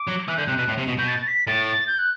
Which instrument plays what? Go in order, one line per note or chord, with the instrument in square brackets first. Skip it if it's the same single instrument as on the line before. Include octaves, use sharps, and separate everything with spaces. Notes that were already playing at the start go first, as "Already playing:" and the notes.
Already playing: [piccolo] D6
[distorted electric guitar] F#3
[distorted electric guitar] E3 [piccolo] F#6
[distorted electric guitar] D3 [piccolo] G6
[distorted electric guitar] C3 [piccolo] F#6
[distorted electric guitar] B2
A2
C3
B2
[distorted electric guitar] B2 [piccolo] G6
[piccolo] A6
A6
B6
[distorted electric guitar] A2 [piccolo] A6
[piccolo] G6
F#6